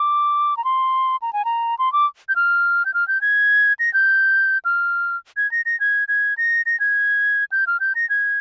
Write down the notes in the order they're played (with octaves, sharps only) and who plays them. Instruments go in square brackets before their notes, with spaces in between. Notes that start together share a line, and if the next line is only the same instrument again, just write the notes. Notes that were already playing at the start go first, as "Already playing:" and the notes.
Already playing: [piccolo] D6
A#5
C6
A#5
G#5
A#5
C6
D6
G6
F6
G6
F6
G6
G#6
A#6
G6
F6
G#6
A#6
A#6
G#6
G#6
A#6
A#6
G#6
G6
F6
G6
A#6
G#6